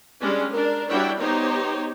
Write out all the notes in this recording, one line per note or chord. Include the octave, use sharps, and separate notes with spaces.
G3 G#3 C#4 D4
D4 A#4
G3 D4 E4 F#4 C#5 G5
B3 D#4 G4 C5 C#5